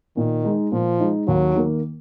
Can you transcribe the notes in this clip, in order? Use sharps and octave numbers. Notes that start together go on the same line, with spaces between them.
A#2 D#3
G#3 D#4
A#2 F3
G#3 D#4
D#2 F#3
D#3 A#3